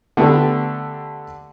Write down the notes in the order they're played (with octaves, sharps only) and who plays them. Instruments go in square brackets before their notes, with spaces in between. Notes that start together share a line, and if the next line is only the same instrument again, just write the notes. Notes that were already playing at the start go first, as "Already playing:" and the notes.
[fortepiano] D3 A3 B3 G4